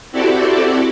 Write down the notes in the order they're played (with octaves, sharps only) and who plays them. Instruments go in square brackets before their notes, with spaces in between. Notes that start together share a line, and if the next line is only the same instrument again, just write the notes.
[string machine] C4 E4 F#4 G4 A4 D5